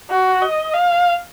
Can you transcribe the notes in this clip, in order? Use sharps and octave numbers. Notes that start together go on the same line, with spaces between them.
F#4
D#5
F5